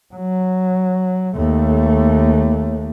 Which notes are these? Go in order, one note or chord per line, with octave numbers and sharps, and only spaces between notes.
F#3
D#2 A3